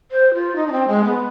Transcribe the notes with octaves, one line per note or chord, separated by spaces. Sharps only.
C5
F4
D#4
D4
C4
G#3
B3